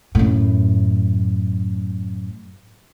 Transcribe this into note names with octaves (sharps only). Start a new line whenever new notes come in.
F#2 A2